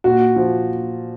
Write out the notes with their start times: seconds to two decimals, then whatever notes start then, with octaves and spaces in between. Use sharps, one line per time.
0.04 A#2 F#4
0.36 F3